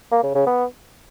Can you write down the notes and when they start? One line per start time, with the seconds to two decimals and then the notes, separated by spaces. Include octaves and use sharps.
0.12 A#3
0.23 C#3
0.35 C#3
0.46 B3